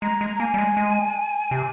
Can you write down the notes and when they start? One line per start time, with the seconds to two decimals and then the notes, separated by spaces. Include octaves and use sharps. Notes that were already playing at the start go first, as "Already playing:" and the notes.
0.02 G#3 A#5
0.21 G#3
0.35 A#5
0.40 A#3 G#5
0.54 G3
0.58 G#3
0.77 G#3
1.51 C3